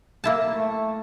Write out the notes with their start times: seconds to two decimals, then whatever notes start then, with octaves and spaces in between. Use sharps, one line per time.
0.24 A#3 E4 A5
0.49 A3